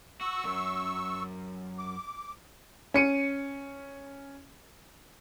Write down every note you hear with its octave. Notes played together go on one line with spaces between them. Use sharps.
F#4 C#6 E6
C2 F#2
D6
C#4 C#7 D#7